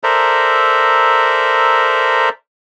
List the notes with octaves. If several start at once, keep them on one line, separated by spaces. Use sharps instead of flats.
A4 A#4 C5 D5 E5 A#5